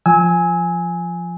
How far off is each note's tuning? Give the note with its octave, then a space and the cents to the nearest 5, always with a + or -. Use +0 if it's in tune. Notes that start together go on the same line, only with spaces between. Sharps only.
F3 +0 G#5 +0 E6 -30